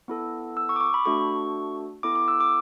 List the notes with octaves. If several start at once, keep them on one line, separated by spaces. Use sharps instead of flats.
B3 E4 A4
E6
C#6
D6
C#6
B5
A3 D4 F#4 A4 C#6
B3 E4 A4 D6
D6
E6
D6